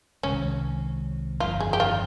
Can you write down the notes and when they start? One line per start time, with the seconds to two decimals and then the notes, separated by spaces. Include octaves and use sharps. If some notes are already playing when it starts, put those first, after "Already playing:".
0.23 C2 C3 D#3 G#3 C#4
1.40 G1 F2 D#3 F4
1.60 G#4
1.73 G4
1.80 F4